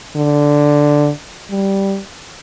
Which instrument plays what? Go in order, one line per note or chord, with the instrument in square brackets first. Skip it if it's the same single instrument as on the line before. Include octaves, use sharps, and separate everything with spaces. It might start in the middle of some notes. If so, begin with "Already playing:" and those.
[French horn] D3
G3